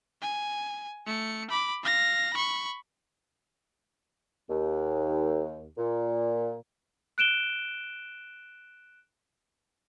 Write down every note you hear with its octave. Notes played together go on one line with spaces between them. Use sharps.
G#5
A3 C#7
B5 D6
F5 A#6
B5 C#6
D#2
A#2
F#6 D7 E7 G7